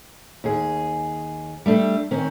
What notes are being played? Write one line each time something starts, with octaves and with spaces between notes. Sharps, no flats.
D#2 G#4
G3 A3 D4
D#3 C4 C#4